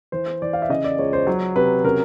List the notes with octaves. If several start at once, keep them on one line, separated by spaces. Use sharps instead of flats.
E3 C5
E3 D5
F5
E5
C#3 D#5
D5
C#2 C#5
C5
F#3
C3 B4
C#3 A#4